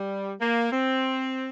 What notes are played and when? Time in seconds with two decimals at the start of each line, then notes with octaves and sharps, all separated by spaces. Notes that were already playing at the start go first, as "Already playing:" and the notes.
Already playing: G3
0.40 A#3
0.72 C4